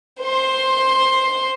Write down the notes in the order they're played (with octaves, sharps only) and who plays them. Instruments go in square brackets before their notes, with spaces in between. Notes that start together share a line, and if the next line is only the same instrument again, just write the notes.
[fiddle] C5 C6